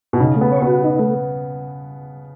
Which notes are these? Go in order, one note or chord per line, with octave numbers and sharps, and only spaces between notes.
B2
C#3 D#4
A3
B3
C#5
B3 F#4
D#4
A3